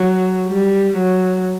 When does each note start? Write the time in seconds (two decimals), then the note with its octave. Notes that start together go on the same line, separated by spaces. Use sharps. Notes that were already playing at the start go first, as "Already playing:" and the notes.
Already playing: F#3
0.48 G3
0.97 F#3